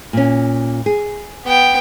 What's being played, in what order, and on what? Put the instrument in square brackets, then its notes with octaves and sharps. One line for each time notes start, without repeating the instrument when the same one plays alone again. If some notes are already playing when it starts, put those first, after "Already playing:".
[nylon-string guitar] A#2 C#4
G#4
[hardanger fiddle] B3 G5